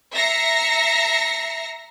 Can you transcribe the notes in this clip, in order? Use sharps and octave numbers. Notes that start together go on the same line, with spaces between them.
E5 A#5 A#6 C7 C#7